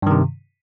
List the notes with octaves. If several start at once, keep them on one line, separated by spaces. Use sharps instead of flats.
G2 C3 D#3